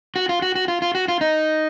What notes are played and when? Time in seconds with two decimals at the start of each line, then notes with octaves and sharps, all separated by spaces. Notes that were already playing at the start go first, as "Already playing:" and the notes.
0.16 F#4
0.29 F4
0.42 F#4
0.55 F#4
0.68 F4
0.82 F4
0.95 F#4
1.08 F4
1.21 D#4